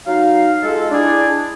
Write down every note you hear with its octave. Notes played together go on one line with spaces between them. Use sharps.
F#3 D#4 F5
G#3 F4 A4
D4 E4 G#4 D5